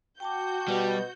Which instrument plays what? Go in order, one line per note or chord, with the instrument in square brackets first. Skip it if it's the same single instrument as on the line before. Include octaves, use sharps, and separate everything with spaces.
[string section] F#4 G6 [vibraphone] G5 A5 D6
[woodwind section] B2 [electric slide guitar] G3